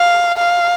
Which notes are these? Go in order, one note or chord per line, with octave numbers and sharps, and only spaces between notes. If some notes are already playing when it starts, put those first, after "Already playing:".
Already playing: F5
F5